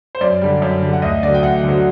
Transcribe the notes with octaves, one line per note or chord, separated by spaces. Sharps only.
C5
F#2 D5
D3 G3
F#2
D3 G3
F#5
D2 D#5
D3 F#3 D5
G5
D2 F#5
D3 F#3